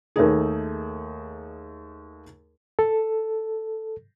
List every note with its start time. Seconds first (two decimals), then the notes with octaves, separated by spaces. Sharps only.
0.16 D#2 A3 D#4 G#4
2.79 A4